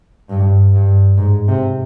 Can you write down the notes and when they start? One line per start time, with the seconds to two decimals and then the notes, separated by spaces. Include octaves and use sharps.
0.29 G2
0.74 G2
1.18 G#2
1.48 C3